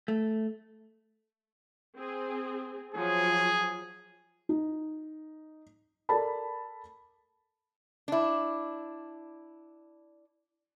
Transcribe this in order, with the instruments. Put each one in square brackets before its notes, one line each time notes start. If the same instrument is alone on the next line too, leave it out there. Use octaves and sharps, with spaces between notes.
[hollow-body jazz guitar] A3
[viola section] C4 G#4
[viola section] F3 F#3 [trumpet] G#4
[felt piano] D#4
A4 A#4 D5 A5 B5
[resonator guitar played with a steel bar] D4 E4